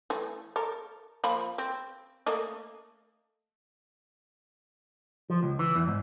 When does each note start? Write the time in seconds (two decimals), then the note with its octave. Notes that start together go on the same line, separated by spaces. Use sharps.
0.10 E3 A3
0.56 A4 A#4
1.24 F3 A#3 B5
1.58 C4
2.26 A3 A#3 D#5
5.30 F3
5.43 C#2
5.59 E3
5.75 E2
5.87 G#2